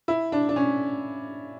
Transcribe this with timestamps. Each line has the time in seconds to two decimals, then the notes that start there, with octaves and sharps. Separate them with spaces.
0.08 E4
0.32 D4
0.49 D4
0.56 C#4